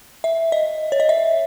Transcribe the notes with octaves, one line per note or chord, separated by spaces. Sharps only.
E5
D#5
C#5
D#5
E5